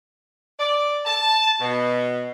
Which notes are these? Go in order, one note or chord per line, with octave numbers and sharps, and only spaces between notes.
D5
A5
B2